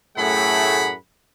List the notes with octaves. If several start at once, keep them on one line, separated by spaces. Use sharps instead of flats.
F#2 A2 A3 G#4 F#5 B5